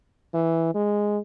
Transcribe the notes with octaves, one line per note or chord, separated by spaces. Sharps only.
E3
G#3